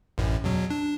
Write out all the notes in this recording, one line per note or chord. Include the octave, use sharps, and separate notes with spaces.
A1 F#2 A2
E2 B2 F#3
D4